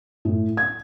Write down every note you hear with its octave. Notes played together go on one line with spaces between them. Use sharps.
A2
G#6